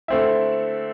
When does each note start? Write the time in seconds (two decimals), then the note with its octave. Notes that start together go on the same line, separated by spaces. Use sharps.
0.08 D3 A3 C4 E4